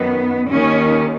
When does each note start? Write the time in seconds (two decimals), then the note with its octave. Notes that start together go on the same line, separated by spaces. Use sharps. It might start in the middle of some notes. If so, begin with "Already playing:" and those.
Already playing: F#2 D#3 B3
0.48 D#2 D#3 C#4